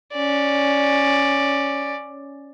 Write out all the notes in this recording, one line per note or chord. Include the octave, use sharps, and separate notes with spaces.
C#4 D5